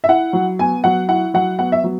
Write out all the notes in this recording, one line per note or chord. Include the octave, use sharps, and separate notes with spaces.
E5
E4 F#5
F#3
B3 G#5
F#3 F#5
E4 F#5
F#3 F#5
B3 F#5
E5
F#3